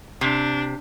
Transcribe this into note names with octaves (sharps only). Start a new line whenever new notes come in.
C3 D4